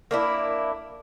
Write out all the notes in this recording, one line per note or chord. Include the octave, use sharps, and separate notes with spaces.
A#3 D4 E4